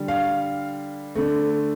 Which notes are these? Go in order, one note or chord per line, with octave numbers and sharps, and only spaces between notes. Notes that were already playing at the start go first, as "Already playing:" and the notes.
Already playing: D3 G3
F5
D3 A3